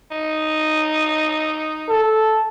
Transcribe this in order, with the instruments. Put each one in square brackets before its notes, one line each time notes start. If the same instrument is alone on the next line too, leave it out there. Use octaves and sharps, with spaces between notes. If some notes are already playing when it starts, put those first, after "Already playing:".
[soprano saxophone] D#4
[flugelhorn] A4